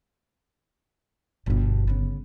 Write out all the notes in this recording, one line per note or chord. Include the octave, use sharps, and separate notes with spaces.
G1 G2 B2
C#3 B3